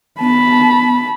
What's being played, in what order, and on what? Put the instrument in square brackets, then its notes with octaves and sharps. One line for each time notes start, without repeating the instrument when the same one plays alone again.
[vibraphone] B3 [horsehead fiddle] A5 B5